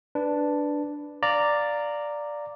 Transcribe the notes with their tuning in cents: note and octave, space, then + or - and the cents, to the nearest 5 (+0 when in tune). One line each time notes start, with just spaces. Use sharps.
D4 +0 B4 +0
D5 +0 F5 +0 A#5 -10